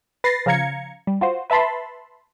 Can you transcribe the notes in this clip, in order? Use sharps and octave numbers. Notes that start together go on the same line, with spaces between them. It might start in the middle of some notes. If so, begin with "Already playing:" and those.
B4 A6 A#6 C7
C#3 F3 F5 A#5 G#6 C#7
G3
F4 F#4 C5
B4 E5 A5 B5 C6